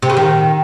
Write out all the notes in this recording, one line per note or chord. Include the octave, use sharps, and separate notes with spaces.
C3
C#3
D#3